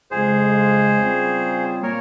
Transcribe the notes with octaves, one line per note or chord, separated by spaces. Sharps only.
F2 C#3 G#3 G#4 C5
C#3 G3 C4 F4
A#2 G3 A#3 A#4 C#5